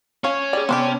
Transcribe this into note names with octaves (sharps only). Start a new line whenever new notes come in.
C#4 C#5 F5
G3 G#4 D5
C3 B3 C4 D4 G4